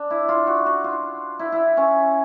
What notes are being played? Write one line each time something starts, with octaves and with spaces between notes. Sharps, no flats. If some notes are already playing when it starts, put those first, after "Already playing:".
Already playing: D4
E4
F4
F#4
F#4
F4
E4
E4
C#4